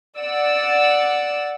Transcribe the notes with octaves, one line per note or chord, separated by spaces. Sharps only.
D5 F#5 E6